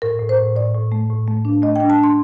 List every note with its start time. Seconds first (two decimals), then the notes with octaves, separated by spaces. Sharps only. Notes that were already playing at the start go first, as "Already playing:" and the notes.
0.02 A2 A#4
0.20 A2
0.29 C5
0.38 A2
0.56 A2 D5
0.74 A2
0.92 A3
1.10 A2
1.28 A3
1.45 D4
1.62 A3 D#5
1.76 G5
1.80 D4
1.90 A5
1.99 D4 C6